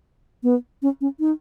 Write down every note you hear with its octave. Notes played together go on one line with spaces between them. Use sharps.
B3
C#4
C#4
D#4